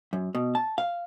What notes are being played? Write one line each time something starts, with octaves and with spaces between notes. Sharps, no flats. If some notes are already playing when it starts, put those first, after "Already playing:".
F#2
B2
A5
F5